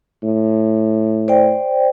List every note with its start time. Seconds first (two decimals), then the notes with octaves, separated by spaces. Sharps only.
0.23 A2
1.28 C5 D5 G5